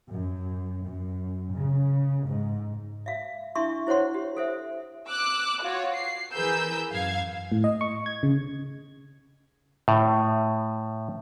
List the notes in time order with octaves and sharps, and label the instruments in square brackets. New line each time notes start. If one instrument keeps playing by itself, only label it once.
[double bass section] F#2
F#2
C#3
G#2
[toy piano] E5 F5
D4 E4 E5 C6 C#6
E4 C5 C#5 F#5 C6
G4
A4 C5 E5
[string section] D6 E6 F#6
F4 F#4 C#5
C7
E3 G#4 A#4 B4 E6 G6
F#2 F5 G#6
[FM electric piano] A2
D#5
C#6
G#6
C#3
[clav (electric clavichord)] A2